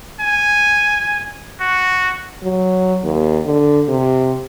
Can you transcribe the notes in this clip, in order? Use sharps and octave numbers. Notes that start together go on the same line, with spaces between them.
G#5
F#4
F#3
D#2
D3
C3